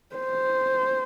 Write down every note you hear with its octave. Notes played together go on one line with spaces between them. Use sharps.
C5